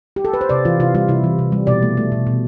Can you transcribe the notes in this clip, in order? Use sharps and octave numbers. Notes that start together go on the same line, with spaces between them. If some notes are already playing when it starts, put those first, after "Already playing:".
G4
A4
B4
C5
C3 D5
E3 F4
C3 F4
G3 F4
C3 E4
E3
C3
G3
B2 D5
A3
A3
B2
B2